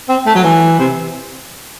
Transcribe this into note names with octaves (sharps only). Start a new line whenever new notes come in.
C4
A3
F#3
E3
C3